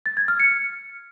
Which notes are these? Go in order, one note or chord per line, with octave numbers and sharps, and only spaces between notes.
A6
G#6
F6
C#7